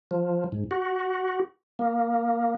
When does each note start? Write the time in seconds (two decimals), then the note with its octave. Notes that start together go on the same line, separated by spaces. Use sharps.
0.11 F3
0.52 G#2
0.71 F#4
1.79 A#3